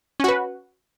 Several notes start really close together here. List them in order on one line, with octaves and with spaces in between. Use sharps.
C#4 F#4 B4